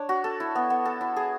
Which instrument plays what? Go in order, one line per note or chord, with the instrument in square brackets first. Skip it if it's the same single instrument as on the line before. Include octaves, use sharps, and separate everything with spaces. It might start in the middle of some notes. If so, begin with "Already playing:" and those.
Already playing: [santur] D4 C#5
F#4
A4
E4
B3
B3
A4
E4
G#4